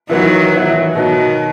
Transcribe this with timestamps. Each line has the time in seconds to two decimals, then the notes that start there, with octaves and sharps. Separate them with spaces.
0.10 D#3 E3 F#3 B3 E4
0.53 E3 B3 E4
0.95 B2 D#3 F#3 B3 D#4